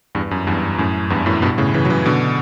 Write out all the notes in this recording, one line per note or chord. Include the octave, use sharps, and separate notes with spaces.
E2 G2
F#2
E2 G2
F#2 A2
E2 G2
F#2 A2
G2 B2
A2 C#3
C#3 E3
F#3
C#3 E3
B2 D3